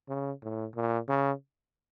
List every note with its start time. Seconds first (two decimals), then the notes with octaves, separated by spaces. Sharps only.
0.09 C#3
0.43 A2
0.76 A#2
1.09 C#3